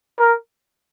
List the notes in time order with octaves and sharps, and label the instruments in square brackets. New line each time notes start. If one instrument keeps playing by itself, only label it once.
[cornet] A#4